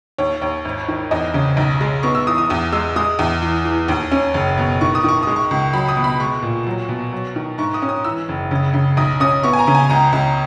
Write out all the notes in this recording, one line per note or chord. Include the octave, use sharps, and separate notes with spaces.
D#2 C#5
D#2 C#5
G#1
D#3
E2 D#5
C#3
B1
G#3
B3 C#6
E6
E3 D#6
D#6
E2 D#6
G#3 E6
G#3 D#6
E2
E3
E3
D#2
C#4
F#1
B2
D#3 C#6
D#6
D#3 C#6
G#3 D#6
C#6
C#2
F#3 B5
D#6
B2
B5
G#3 C#6
A#2
F#3
B2
F#3
D#3
G#2 C#6
D#6
C#4
D#6
E3 E6
F#1
C#3
C#3
B1 D#6
C#4 D#6
B3 C#6
G#5
A#5
C#3
G#5
C#2 A#5
C#2